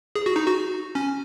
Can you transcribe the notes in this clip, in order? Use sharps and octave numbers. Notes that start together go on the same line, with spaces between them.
G#4
F#4
D#4
F#4
C#4